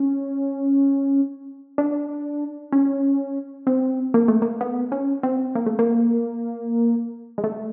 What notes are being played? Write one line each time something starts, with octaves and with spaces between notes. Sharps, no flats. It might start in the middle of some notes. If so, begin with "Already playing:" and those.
Already playing: C#4
D4
C#4
C4
A#3
A3
A#3
B3
C#4
C4
A#3
A3
A#3
G#3
A3